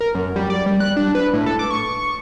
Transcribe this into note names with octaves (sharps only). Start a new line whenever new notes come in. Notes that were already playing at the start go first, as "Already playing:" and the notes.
A#4
F#2
G3
D5
G3
F#6
D4
B4
A2
A4
D6
C#6